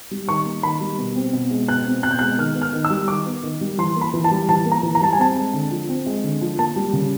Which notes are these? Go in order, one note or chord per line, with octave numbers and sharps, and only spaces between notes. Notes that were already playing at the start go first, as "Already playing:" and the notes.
G3
D#3 C#6
A#3
D#3 B5
G3
B2
C4
B2
G#3
B2 F#6
C4
B2 F#6
G6
G#3 F#6
D#3 F6
B3
F6
D#3
E6
G3
D#3 D6
B3
D#3
G3
E3 C6
A#3
B5
E3
A5
G3
E3 A5
A#3
A#5
E3
A#5
G3 A5
G#5
C4 A5
G#3
D3
F3
C4
G#3
D3
F3
A#3 A5
G3
C#3